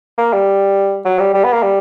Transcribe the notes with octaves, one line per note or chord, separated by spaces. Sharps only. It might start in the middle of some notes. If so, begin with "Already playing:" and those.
A#3
G3
F#3
G3
G3
B3
A#3
G3